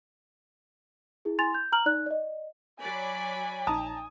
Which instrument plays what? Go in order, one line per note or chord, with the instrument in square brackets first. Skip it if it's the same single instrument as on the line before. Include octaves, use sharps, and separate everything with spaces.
[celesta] E4 G#4
E4 G#5 C6 A6 F7
G6
A#5 F6 F#7
D#4 D5 F#6
D5 D#5
[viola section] F#3 D5 B5 [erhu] G#5
[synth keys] A#1 D#4 [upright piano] A5 A#5 D#6